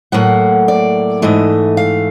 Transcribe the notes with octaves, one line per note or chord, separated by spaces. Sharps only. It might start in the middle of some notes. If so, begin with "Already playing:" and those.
A2 F#3 A#3 F#5
D5
G#2 E3 A3 D#5
F5